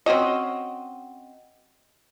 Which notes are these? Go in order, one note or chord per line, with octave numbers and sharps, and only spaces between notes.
C4 C#4 F#4 D#5